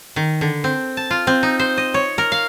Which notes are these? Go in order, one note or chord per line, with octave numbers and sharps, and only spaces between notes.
D#3
D3
C4
A5
F4
C4
D#4
C5
D#5
C#5
A#4
F5